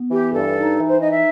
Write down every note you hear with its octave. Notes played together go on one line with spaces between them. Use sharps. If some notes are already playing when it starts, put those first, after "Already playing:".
Already playing: B3
E3 G4
G2 A4
D#4
E3
C5
D#4 D#5
E5